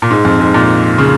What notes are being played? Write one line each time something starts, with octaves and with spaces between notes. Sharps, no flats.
A#2
G#2
F2
G#2
A#2
C#3